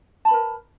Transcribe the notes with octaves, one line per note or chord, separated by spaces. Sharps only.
A#4 B4 A5 B5